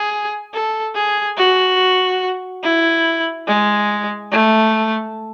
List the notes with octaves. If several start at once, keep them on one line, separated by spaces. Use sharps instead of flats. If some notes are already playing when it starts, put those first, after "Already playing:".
Already playing: G#4
A4
G#4
F#4
E4
G#3
A3